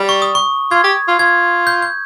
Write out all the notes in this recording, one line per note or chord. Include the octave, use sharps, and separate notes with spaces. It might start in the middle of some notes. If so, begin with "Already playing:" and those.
Already playing: G3
C#6
D#6
C#6
F4 G#6
G4
F4
F4 G#6
G6
G6